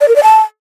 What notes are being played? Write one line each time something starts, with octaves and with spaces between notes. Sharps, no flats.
D5
A#4
D5
A5